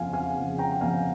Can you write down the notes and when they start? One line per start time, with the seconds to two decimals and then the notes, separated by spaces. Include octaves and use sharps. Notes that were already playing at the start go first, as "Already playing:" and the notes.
Already playing: F2 C#3 F3 F5 G#5
0.13 F5 G#5
0.36 C#3 F3
0.58 G5 A#5
0.81 F2 F5 G#5